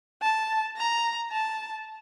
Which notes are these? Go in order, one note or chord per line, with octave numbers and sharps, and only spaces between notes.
A5
A#5
A5